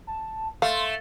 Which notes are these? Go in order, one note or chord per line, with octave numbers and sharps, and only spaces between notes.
A5
A3 F5 C6